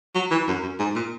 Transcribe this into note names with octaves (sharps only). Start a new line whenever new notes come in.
F#3
E3
F#2
F#2
G#2
A#2